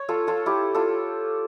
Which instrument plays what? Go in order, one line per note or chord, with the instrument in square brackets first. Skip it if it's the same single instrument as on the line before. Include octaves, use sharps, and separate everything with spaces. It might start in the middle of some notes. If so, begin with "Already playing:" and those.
Already playing: [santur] C#5
F4 A4
F4 A4
E4 G4
F4 A4